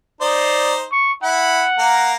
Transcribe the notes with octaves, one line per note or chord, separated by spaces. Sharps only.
D#4 C5 D5
C#6
E4 F#5
A#3 A#4